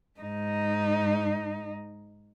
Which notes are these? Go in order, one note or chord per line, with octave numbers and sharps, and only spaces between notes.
G#2 D#4